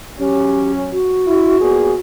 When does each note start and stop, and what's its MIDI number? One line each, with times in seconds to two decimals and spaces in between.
0.19 0.96 54
0.19 0.96 61
0.19 0.72 67
0.92 2.00 66
1.26 1.58 64
1.59 1.92 46
1.59 1.92 59
1.59 1.92 68